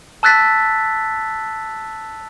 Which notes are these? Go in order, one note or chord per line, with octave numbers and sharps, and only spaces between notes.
A5 E6 F#6 A6 B6